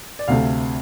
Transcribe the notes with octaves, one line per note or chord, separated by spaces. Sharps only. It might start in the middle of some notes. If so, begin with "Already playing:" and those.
D5
D2 C3 A3 F5